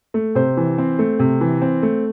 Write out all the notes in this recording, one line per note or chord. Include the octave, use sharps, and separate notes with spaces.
A3
C3 C5
E3
C4
A3
C3
E3
C4
A3